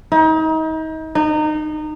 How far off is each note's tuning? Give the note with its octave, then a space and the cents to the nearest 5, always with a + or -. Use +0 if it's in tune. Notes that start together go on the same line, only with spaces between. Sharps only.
D#4 +35
D#4 -25